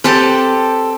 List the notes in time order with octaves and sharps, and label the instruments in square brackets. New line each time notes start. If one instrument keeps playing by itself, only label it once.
[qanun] C4 B4 G5 [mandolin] G4 A4 A5